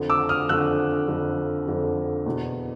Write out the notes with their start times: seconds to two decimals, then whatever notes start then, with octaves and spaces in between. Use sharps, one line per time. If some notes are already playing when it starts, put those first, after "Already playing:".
Already playing: F2 D3
0.10 D6 E6
0.29 D#6 F6
0.49 F2 D3 E6 F#6
1.08 F2 D3
1.67 F2 D3
2.26 E2 B2